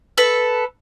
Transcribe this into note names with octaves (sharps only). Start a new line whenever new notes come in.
A4 B4 E6